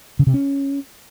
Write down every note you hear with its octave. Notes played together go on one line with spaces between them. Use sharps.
C#3
C3
C#4